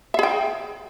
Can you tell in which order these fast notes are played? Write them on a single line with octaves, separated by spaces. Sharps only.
E5 G#4 G5